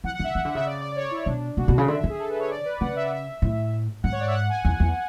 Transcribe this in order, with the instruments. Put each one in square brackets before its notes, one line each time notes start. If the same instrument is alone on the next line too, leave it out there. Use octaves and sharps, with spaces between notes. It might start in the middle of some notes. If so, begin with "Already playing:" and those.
[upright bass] E3 [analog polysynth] F#5
[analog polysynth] F#5
[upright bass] D3 [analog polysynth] E5
[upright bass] E3
D3
[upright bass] C#3 [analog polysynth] E5
[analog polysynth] D5
D5
D5
C#5
E4
[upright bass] B2 [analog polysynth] D4
[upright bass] B2 [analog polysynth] F#4
[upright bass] B2
C#3
[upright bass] D3 [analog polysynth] E5
[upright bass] D3
[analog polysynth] G#4
A4
B4
C#5
D5
B4
[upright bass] C#3 [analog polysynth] F#5
[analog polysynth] E5
E5
[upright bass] A2
[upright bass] G#2 [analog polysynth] F#5
[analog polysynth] C#5
D5
E5
F#5
G#5
[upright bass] E2
E2